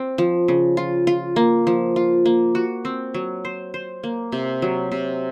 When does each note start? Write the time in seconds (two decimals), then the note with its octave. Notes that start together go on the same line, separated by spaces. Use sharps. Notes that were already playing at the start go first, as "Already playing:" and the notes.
Already playing: C4
0.18 F3
0.48 C#3
0.77 F4
1.07 F4
1.36 A#3
1.67 F3
1.96 F4
2.26 A#3
2.55 F#4
2.85 C4
3.14 F#3
3.45 C5
3.74 C5
4.03 A#3
4.32 C3
4.62 F#3
4.92 C3